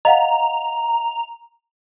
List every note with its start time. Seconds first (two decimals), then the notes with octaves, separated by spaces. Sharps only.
0.05 D#5 F5 F#5 A#5